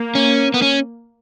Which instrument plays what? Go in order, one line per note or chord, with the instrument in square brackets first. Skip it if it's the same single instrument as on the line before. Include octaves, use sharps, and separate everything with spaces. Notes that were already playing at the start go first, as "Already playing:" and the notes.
Already playing: [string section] A#3
[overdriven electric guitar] C#4
B3
C#4